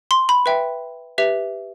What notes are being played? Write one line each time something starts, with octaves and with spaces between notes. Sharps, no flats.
C6
B5
B4 E5 G5
G4 B4 E5